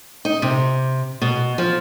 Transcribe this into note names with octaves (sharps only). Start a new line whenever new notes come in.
D#4
C3
B2
F3